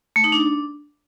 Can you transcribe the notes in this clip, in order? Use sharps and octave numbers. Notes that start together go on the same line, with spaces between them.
A3
D#4
D4